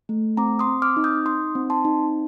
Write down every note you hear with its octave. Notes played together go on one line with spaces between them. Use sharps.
A3
C4 A#5 D6
C6 D#6
C4
D6 F6
D#4
D#6 G6
D#4 C6 D#6
C4
A5 C6
D#4